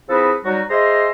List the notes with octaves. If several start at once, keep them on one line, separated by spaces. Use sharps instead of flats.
F3 C4 E4 G#4 A4 B4
F#3 G3 D#4 F#4
G#4 C5 D#5 E5 A#5 C6